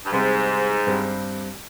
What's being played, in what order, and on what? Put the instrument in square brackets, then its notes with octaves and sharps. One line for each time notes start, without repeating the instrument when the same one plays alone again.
[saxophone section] G2
[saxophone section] G#2 [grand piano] C3 G3 C4 G4
[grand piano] G2 G3 C4 G4